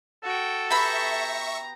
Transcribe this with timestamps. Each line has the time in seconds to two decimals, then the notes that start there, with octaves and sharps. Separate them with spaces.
0.23 F#4 A4 G5
0.71 B3 G4 E5 A#5 B5 C#6